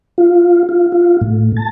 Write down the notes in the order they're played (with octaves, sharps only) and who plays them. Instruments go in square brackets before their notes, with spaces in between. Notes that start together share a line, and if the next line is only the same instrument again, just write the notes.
[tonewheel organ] F4
F4
F4
A2
A5